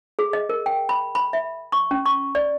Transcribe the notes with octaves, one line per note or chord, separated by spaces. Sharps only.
G#4
D#5
A#4
G5
B5
B5
E5
C#6
C#4
C#6
D5